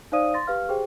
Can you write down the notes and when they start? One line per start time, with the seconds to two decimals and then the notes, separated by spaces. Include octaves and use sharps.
0.12 D#4 C5 D5 F5 D#6 D#7
0.34 C6 A6 A#6
0.47 G4 B4 F5 F6
0.69 G4 G#4 C5 G5